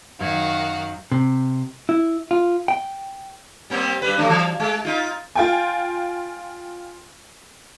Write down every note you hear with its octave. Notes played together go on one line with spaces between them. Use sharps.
F#2 D#3 F#4 F5 C#6 G#6
C3
E4
F4
G5
G3 A#3 C4
G2 G3 B4
F3 A3 D4
E3
G#3
D#4 F4
F4 G5 G#5